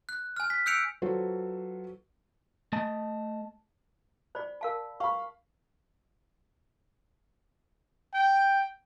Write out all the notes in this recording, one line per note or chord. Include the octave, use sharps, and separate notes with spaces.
F#6
G#5 F6
B6
E6 F#6 G6 C#7 D7 F7
F#3 F4 F#4 A4 B4 C5
A3 D#5 A5
C5 D5 B5
A#4 F5 A5
F5 B5 C#6
G5